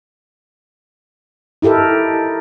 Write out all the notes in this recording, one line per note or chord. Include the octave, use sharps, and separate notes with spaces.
D#4 E4 G4 A4 A#4